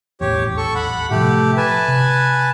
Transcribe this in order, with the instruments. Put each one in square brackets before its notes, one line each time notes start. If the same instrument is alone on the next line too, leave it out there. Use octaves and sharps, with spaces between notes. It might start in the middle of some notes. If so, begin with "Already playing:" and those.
[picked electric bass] D#1 A1 E2 [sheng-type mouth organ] G4 C#5
[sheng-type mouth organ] A4 C#6
F#5 B5
[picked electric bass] A2 C3 F3 [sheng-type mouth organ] A3 G4
[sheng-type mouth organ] B4 G#5 A5
[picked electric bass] C3